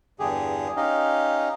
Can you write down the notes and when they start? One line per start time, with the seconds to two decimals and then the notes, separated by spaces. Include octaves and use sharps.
0.20 E2 G2 D3 G4 G#4
0.76 C#4 D#4 G4 D#5 F5